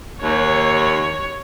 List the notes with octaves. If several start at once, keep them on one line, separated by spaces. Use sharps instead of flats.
D#2 C#5